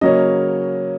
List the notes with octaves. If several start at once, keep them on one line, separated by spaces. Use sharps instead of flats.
C#3 F#3 A#3 C#4 D#5